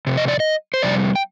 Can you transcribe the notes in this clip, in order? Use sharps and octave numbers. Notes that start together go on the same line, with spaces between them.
F2 C3
D#5
D5
D#5
C5
F2 C3 G3 D5
G5